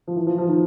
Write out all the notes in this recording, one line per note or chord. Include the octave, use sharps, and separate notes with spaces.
F3
E3
F3
F3
D#3